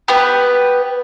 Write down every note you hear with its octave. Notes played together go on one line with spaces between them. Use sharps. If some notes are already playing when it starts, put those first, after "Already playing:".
B3 G4 B4